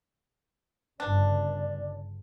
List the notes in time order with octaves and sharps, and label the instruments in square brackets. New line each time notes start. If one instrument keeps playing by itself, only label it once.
[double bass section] G1 C#3 [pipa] D4 [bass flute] D5